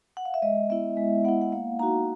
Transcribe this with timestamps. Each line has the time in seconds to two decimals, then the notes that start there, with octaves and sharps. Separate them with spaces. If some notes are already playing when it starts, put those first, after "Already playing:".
0.17 F#5
0.25 F5
0.34 E5
0.42 G#3 D#5
0.70 B3 E4 E5
0.97 G#3
1.24 B3 F#5
1.29 E4
1.42 F#5
1.52 A#3 F5
1.79 D#4 F#4 A#5